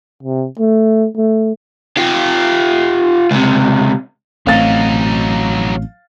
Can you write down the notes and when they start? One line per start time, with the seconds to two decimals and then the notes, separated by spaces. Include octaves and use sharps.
0.23 C3
0.59 A3
1.17 A3
1.97 F4 G4
3.31 C#2 C3
4.47 A1 F#3 A3 C4 D#4 F5 A6